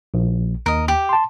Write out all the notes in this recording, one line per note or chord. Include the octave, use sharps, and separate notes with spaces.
A#1
D#2 A#4 D#5
G4
A5 C6